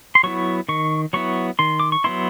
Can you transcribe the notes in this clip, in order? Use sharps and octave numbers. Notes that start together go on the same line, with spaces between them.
C6
F#3 B3 E4 C#6
D#3 C#6
F#3 B3 E4 C#6
D#3 C6
D6
C#6
F#3 B3 E4 C6